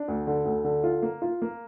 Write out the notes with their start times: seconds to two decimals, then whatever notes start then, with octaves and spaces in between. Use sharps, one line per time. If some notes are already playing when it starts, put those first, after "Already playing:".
Already playing: D4
0.08 D2
0.27 D3
0.45 D2
0.64 D3
0.84 F4
1.02 A#3
1.22 F4
1.42 A#3